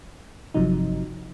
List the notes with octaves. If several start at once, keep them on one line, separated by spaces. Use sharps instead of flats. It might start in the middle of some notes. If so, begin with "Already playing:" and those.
G1 C3 F3 F#3 D#4